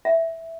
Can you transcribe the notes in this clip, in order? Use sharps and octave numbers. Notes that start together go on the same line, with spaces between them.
E5